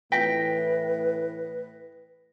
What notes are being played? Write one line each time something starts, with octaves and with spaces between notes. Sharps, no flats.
A2 E3 B4 G5 A#6 B6